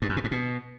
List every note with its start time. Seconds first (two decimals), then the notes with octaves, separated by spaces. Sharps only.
0.02 G2
0.09 F#2
0.17 B2
0.24 G#2
0.31 B2